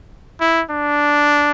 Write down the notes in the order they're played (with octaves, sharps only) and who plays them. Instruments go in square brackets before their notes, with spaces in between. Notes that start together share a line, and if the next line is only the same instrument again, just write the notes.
[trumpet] E4
D4